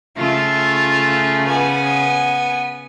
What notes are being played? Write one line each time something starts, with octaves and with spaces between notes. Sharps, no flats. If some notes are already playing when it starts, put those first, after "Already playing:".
C#3 A3 F4
B3 G#5